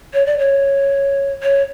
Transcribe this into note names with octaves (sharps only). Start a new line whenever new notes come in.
C#5
D5
C#5
C#5